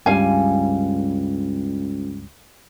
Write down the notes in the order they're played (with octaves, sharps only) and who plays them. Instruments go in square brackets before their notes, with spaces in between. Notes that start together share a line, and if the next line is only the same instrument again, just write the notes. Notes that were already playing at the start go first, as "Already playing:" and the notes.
[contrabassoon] C#2 [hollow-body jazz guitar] G2 G3 [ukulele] F5 G#5